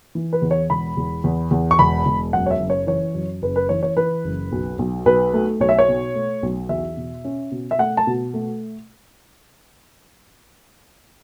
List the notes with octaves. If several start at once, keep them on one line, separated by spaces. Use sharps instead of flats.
E3
B4
E2
C#5
E1 B5
E2
E2
E2
C#6
E1 B5
E1
F#2 F#5
C#5
E5
F#1
C#5
E3 C#5
F#2
F#1 B4
B4
E3 C#5
C#5
E3 B4
F#1
B1
B1
B1 B4
A3
B1 C#5
E5
C#5
B2
A3
B1
E2 E5
B2
C#4
B2
E5
A3 F#5
A5
B2
A3